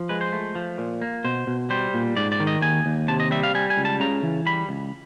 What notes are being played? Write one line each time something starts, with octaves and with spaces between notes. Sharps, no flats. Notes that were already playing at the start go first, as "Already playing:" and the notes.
Already playing: F3
G#3 B4
C5
A3
F3
A#2
A#3
B2 C5
B2
G3 C5
A#2
G#2 D5
D5
D#3
D#5
D#2 G#5
D#2
C3 A5
D#5
G3 E5
F5
G3 G#5
G#5
C#2
A5
C#3 A#5
E3
G3 B5
C#2